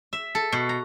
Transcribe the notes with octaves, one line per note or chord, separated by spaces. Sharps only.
E5
A4
B2
A#5